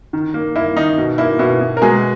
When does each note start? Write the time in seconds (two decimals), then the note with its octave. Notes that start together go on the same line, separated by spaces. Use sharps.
0.13 D#3
0.34 A#3
0.56 A#3 E4
0.77 D#3 D#4
0.98 B2
1.18 A#3 E4
1.39 B2 E4
1.61 B2
1.77 A#4
1.82 B2 G#3 G#4